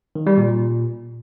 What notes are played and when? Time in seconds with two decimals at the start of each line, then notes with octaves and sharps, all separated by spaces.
0.15 D#3
0.27 G3
0.38 A#2